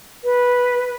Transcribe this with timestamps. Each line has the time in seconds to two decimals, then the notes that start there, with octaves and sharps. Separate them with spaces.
0.24 B4